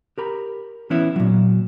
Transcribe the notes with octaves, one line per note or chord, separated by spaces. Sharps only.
G4 A#4 B5
E3 B3 C#4 E4
A#2 F#3